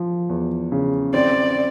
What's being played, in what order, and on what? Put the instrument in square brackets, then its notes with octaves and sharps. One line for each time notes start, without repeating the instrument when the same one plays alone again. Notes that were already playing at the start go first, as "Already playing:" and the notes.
Already playing: [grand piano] F3
E2
C#3
[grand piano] C4 [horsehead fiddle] D5